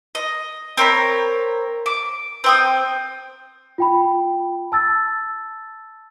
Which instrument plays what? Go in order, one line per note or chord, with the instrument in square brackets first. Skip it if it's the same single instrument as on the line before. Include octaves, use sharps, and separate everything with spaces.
[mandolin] D#5
C4 A#4 C#5 B5
D6
C4 G5 D#6
[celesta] F4 G5 B5
A5 E6 A6